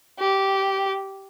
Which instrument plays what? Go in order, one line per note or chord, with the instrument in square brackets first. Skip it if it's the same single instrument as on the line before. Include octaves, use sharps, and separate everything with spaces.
[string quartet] G4